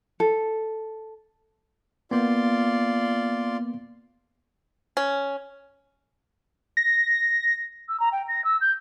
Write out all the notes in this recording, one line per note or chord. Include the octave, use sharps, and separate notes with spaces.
A4
A#3 B3 F4 D5 C6
C#4
A#6
E6
A#5
G5
A#6
E6
G6